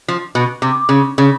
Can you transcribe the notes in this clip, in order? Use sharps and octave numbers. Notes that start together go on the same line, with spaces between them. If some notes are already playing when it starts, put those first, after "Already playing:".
F3
B2
C3
C#3
C#3